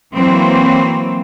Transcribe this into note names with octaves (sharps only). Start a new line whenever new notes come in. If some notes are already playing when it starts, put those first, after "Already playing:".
E3 F#3 A#3 C4